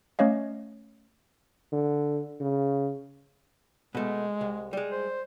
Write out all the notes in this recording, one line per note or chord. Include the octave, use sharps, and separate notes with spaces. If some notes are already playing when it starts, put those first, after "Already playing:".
A3 C#4 C#5 D#5 F5
D3
C#3
B2 G#3 A3
C2
G3 G#3
C5